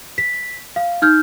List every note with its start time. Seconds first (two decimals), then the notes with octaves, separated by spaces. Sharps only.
0.18 B6
0.76 F5
1.02 D#4 F6 G6